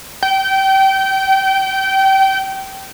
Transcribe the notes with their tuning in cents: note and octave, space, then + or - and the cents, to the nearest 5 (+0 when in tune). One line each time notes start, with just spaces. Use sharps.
G5 -25